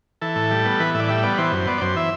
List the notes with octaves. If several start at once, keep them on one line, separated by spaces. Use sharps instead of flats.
E3 A4
A2
G3
B3
E3 B4
A2 E5
D5
G3 E5
B3 D5
E3 C5
F#2
B3 D5
D5
F#2 C5
E3 E5